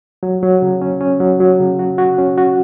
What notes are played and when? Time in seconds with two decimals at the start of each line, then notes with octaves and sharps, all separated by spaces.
0.23 F#3
0.43 F#3
0.62 C#3
0.82 C#4
1.01 C#4
1.20 F#3
1.40 F#3
1.60 C#3
1.79 F#4
1.98 F#4
2.18 C#4
2.38 F#4